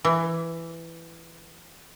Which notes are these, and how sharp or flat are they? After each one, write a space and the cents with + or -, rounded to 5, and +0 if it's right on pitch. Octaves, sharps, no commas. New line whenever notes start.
E3 +10